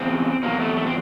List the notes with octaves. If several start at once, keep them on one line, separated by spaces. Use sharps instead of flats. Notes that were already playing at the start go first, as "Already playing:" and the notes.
Already playing: E2 C#3 C4
E2 C3 F#3 A#3
A3
A3
C4